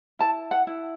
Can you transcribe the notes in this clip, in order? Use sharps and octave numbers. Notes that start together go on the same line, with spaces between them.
E4 A5
F#5
E4